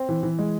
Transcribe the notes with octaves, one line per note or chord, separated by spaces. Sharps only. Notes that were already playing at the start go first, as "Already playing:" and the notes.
Already playing: C4
E3
E3
G#3